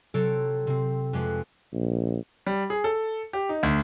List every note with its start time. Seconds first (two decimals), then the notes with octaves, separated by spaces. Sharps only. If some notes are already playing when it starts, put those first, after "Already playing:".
0.14 C3 F#3 C4 A4 C#5 D7
0.67 C3 C4
1.13 F2 G#3 G4 B4
1.73 A#1
2.47 G3
2.70 G#4
2.84 A4
3.33 G4
3.49 D#4
3.63 D2